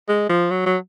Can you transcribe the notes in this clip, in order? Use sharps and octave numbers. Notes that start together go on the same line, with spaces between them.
G#3
F3
F#3
F#3